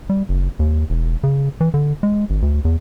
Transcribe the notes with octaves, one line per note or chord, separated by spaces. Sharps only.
G3
F#1
D#2
E1
C#3
E3
D3
G#3
G#1
D2
E2